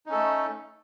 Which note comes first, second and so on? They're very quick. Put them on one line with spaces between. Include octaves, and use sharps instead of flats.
D#4 C#4 A4 A3